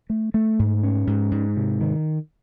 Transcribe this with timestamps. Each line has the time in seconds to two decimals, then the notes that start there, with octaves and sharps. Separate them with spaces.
0.10 A3
0.34 A3
0.59 G#2
0.83 C#4
1.07 G#2
1.32 G#2
1.56 C3
1.81 D#3